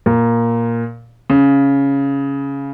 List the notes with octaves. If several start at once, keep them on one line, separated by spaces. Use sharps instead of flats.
A#2
C#3